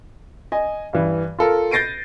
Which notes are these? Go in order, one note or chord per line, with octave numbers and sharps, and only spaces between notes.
D#5 G#5
G2 E3
F4 A4 A#4
G6 A6 A#6 C7 D7 D#7